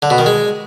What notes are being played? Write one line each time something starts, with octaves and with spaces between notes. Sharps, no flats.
D3
B2
D#3
G#3